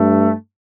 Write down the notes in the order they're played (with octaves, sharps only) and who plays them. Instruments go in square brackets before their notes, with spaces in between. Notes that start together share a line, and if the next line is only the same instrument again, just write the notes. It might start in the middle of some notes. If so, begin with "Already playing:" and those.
Already playing: [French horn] G2 [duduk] A3